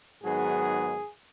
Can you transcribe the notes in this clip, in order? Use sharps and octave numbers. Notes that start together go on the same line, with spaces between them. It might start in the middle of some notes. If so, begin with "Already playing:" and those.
G#2 D#3 F#3 B3 G#4